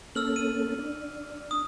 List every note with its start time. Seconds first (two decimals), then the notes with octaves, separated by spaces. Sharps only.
0.15 A#3 C#4 A4 E6 F6 F#7
0.36 D#7
0.79 D4
1.51 D#6